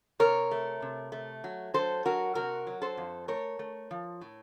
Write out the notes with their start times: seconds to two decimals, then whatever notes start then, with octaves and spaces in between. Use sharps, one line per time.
0.20 C3 A#4 C#5
0.51 A3
0.82 C3
1.12 A3
1.44 F#3
1.74 F#3 A4 C5
2.05 F#3 F#4 A#4
2.35 C3 F#4 A#4
2.67 F#3
2.82 A4 C5
2.97 F2
3.28 A3 A#4 C#5
3.59 A3
3.91 F3
4.21 A2